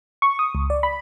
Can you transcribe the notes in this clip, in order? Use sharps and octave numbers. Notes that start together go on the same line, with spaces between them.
C#6
D#6
C#2
D5
B5